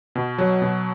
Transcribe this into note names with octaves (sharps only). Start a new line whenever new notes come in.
B2
F#3
B2